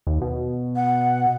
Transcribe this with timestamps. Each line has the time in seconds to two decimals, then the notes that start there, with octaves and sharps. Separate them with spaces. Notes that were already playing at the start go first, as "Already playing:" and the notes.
0.07 D#2
0.21 B2
0.76 F#5